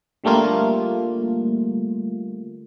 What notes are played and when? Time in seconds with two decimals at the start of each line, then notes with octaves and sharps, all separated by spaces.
0.24 D3 G3 A3 A#3 F4